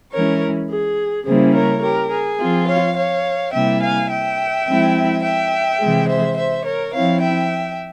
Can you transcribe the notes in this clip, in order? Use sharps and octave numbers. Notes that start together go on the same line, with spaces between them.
E3 G#3 C#4 E4 A#4 C#5
G#4
C#3 G3 A#3 C#4 E4 G#4 C5
A#4 C#5
G4 A#4
G#4
F3 C4 F4
C#5 F5
C#5 F5
C3 G3 A#3 E4 E5 G5
F5 G#5
E5 G5
F3 G#3 C4 E4
E5 G5
C3 E3 G#3
C5 E5
C5 E5
A#4 C#5
F3 C4 E4 C#5 F5
E5 G5